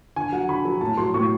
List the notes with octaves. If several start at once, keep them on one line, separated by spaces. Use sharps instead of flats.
D3 G#5
F#3 F#5
D3 B5
F#3
A2 A5
F#3 C6
A2 C#6